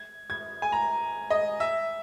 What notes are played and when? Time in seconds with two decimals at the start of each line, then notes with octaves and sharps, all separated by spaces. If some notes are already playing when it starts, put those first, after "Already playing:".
Already playing: G#6
0.30 G#6
0.62 G#5
0.72 A#5
1.30 D#5
1.60 E5